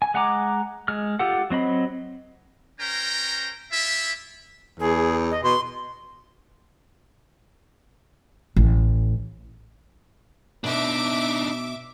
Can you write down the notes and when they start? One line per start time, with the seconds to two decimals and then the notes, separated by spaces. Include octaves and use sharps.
0.02 G#5
0.14 G#3 F#5 G#5 A#5 D6
0.88 G#3 F6
1.19 F4 G4 A4 F#5
1.50 F#3 C4 D#5 B5
2.80 C#4 A#4 C5 G5 A#5
3.72 E4 F4 G4 E5
4.80 E2 G#4
5.31 D#5
5.43 B2 C6
8.56 A1
10.64 B2 D4 D#4 E5 D6